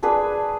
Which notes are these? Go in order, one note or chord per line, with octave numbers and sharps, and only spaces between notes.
D4 G#4 B4